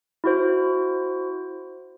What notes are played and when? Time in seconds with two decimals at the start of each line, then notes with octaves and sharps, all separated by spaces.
0.24 E4 F#4 C5